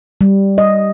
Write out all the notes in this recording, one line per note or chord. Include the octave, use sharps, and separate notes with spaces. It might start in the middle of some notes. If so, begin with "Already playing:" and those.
G3
D#5